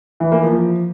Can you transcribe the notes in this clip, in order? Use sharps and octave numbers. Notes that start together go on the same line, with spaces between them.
E3
A#3
F3